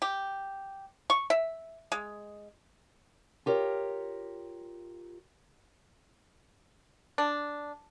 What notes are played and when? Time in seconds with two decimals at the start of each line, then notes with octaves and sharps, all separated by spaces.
0.02 G4
1.10 C#6
1.30 E5
1.92 G#3
3.46 F4 G4 A#4 C#5
7.18 D4